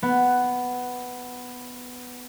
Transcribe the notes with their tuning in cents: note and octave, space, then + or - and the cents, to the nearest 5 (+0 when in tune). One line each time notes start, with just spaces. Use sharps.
B3 +5